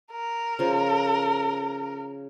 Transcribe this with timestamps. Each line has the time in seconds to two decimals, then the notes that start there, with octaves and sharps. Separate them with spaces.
0.11 A#4
0.59 C#3 F3